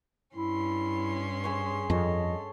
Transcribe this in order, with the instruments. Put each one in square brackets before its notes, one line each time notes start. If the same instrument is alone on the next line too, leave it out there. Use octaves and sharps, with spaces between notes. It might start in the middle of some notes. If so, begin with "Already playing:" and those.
[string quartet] G2 C#4 C6 [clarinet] E4
[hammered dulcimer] G#4 C5 C#5
[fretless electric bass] F2 [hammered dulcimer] A4 C#5 [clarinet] D#5